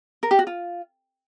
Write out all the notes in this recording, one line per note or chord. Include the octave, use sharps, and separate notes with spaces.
A#4
G4
F#4
F4